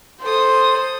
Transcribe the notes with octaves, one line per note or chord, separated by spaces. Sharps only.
A4 C5 D#6